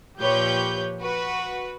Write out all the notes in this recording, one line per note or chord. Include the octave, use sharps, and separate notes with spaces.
A#2 F3 G4 B4 C#5 G6
F#4 B4